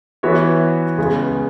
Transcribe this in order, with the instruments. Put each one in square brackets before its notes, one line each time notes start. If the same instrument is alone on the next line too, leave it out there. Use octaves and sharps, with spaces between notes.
[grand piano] E3 B3 F#4 C#5 E5
C#2 C#3 G#3 B3